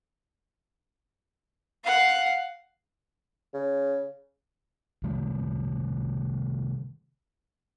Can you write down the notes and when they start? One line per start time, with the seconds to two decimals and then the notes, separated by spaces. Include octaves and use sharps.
1.84 F5 F#5
3.54 C#3
5.03 C3 D#3 G3 A3